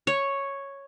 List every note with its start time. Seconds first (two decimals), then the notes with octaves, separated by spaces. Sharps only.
0.07 C#5